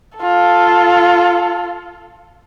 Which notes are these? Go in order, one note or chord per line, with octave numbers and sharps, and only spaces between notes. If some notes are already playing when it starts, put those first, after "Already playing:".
F4 A4